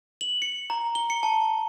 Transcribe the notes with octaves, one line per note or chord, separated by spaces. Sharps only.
F#7
C#7
A#5
G7
C#7
A5